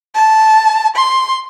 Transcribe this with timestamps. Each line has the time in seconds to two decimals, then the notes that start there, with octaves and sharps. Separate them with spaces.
0.15 A5
0.96 C6